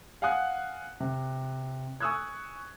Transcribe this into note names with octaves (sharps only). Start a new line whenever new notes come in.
F5 F#5 G#5 D#6 F#6
C3
G#5 C#6 D#6 E6 F#6 G#6